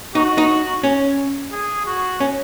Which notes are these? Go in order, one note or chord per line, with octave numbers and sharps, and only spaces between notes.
D#4 F#4
D#4
C#4
G#4
F#4
C#4